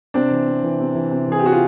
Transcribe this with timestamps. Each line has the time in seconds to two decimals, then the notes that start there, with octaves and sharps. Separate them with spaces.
0.14 C3 C4 D4
0.31 E3
0.47 C3
0.63 E3
0.80 C3
0.95 E3
1.11 C3
1.28 E3 G#4
1.39 G4
1.43 C3 F#4
1.52 F4